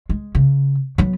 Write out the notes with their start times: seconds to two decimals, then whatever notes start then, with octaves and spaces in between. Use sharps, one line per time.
0.09 G#3
0.35 C#3
0.98 F#3 B3